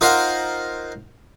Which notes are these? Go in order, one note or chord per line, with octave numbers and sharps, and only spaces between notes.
D#4 F4 A#4 C5 F#5